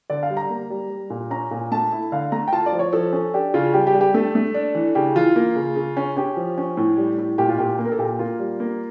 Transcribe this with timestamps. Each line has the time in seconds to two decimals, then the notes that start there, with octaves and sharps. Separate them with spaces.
0.10 D3 D5
0.23 F5
0.30 G3
0.37 A#5
0.50 A#3
0.70 G3
0.90 G3
1.10 A#2
1.31 C#4 A#5
1.51 A#2
1.71 A3 A5
1.92 E4
2.12 D3 F5
2.32 A3 A#5
2.48 G5
2.53 F4 A5
2.66 D5
2.72 F3
2.79 C#5
2.93 F3 A4
3.13 C#4 A4
3.34 D4 G4
3.54 C#3 F4
3.74 G3 G4
3.87 G4
3.94 G3
4.01 G4
4.14 A3 A4
4.35 A3
4.54 D4
4.75 E3
4.95 C#3 G4
5.16 E3 F4
5.36 A#3
5.56 C#3
5.76 C#3
5.97 C#4
6.17 C#4 G4
6.37 F3
6.58 C#4
6.77 A2
6.98 G3
7.18 A2
7.38 A#2 G4
7.49 F4
7.58 A#2 G4
7.79 A#3
7.85 A#4
7.92 A4
7.99 A#2 G4
8.19 A#3 F4
8.39 G3
8.60 A#3